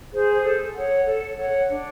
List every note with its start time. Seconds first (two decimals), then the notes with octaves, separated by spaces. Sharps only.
0.12 G#4 C5
0.43 A4
0.74 C#5 F#5
1.06 A4
1.37 C#5 F#5
1.69 D4